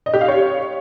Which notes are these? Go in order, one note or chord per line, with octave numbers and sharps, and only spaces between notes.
D#5
G4
F5
C#5